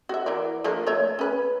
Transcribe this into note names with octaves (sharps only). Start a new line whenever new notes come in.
F#4 E5
E3 A#4 D5
F3 A#3 D4
A3 C#5 E5
C#4 B4